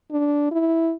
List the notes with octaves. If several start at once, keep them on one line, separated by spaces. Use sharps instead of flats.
D4
E4